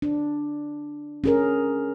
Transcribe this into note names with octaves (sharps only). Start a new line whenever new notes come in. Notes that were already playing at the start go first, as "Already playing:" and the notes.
D4
C#4 G#4 A#4